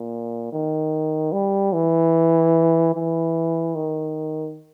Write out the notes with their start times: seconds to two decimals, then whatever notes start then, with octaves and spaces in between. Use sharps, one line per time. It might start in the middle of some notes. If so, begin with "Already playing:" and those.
Already playing: A#2
0.53 D#3
1.33 G3
1.73 E3
2.94 E3
3.75 D#3